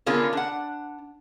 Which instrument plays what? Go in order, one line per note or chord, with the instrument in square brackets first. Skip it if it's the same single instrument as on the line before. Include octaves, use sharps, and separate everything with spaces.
[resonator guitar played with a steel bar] D3 B3 C#4 F4 G#4 A#4
D4 F#5